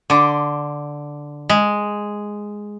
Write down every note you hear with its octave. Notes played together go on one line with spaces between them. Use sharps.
D3 C6 D6
G#3